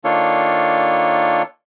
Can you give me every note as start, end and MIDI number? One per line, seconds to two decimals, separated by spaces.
0.04 1.42 51
0.04 1.42 58
0.04 1.42 62
0.04 1.42 65
0.04 1.42 69
0.04 1.42 73